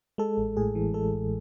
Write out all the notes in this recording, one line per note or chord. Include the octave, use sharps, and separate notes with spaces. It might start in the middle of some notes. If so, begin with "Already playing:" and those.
G#3 A4
A1
A2 G#4
E3
G#3 A4
A1